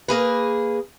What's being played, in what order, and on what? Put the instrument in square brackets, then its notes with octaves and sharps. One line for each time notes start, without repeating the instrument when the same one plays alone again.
[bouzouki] A#3 G#4 B4